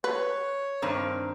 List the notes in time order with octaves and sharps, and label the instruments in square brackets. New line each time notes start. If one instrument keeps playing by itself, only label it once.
[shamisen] B4 [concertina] C#5
[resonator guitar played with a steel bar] G2 D#3 C4